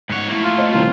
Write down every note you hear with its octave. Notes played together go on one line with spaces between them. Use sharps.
G#2 C#5 F#5 F#6
A3 A#3 E4
F4
C5 D#5
D#1 C2 G3 F4